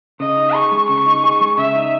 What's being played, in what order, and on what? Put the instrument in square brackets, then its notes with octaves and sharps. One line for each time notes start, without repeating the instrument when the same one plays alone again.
[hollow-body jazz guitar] C#3 [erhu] D#5
[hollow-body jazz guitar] D#4
[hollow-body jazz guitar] G#4 [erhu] C#6
[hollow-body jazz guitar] G#3
[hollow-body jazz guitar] C#3 [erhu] C#6
[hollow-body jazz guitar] D#4
G#4
G#3
[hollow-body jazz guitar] C#3 [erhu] E5
[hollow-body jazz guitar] D#4